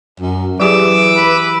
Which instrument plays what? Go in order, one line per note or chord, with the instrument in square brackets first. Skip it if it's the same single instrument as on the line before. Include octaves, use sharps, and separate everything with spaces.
[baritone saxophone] F#2
[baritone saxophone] E3 [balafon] F#3 G4 G#4 [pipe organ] D6 E6
[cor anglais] B4